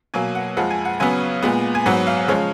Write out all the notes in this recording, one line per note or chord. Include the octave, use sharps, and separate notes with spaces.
B2 F#3 A#3 G#5
F#5
F2 F3 G#3 F#5
G#5
F#5
C#3 F#3 B3 G#5
A#2 G#3 B3
G#5
G#2 F#3 B3 F#5
F5
C#3 F3 G#3 C#5